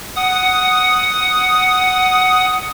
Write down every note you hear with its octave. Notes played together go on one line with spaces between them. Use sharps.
F#5 D#6